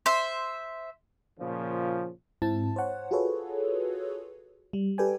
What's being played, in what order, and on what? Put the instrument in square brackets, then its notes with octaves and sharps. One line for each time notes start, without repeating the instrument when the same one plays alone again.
[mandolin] C5 E5
[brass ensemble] A#2 C#3 F3
[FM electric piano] G#2 C4 E4 A5
C5 C#5 F#5
F4 F#4 G#4 A4 B4 C#5
G3
G4 A4 B4 D5 G5 G#5